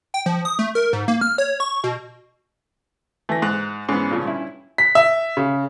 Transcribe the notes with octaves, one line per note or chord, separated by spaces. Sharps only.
G5
F3
D#6
A3
A#4
G#2
A#3
F6
C#5
C#6
B2
E3 A3 A#6
G#2 F#6
G#2 E3 B3 C#4
A#2 C#3 F3
G2 E4
B6
E5
C#3